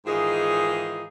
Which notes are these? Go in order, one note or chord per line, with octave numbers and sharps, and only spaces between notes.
G#2 D#3 E3 D#4 F4 G#4